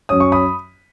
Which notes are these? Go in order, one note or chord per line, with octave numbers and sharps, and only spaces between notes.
F#2 F#3 C#4 D#6
C#6
B5 D#6